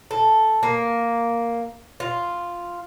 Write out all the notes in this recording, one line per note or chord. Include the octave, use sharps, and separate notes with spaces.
A4
A#3
F4